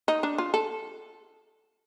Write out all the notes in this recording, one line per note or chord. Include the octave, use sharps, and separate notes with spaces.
D#4
D4
F4
A4